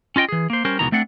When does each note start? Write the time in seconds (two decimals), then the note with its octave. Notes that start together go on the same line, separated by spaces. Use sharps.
0.16 C#4 F4 D#5 G5
0.29 E3 G#4
0.50 A#3 C5
0.65 G3 C#4 A#4 C5
0.79 C#2 B2 D#3 E3 A#5
0.92 A3 C4 D4 F#5